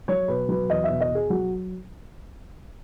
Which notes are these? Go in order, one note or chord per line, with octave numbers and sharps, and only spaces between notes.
F#3 C#5
B2 B4
F#3 B4
E2 D#5
E5
B2
D#5
B2 G#4
F#3 F#4